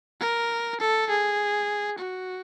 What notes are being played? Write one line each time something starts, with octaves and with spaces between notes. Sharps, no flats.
A#4
A4
G#4
F#4